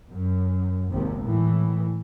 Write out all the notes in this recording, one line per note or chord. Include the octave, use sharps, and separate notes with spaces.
F#2
G#1 D#2 C3
A2 E3